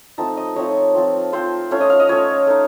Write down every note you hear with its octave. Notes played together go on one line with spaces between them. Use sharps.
F3 A3 C4 D#4 A5
D#5
F3 A3 C4 D#4 C#5
F3 C4 F4
F3 C4 F4 C5
A3 C#4 F4 C#5
D#5
F5
D#5
A3 C#4 F4 C#5
A3 D#4